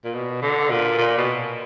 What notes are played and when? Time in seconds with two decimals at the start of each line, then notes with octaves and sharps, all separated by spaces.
0.05 A#2
0.14 B2
0.42 D3
0.70 A#2
0.97 A#2
1.18 B2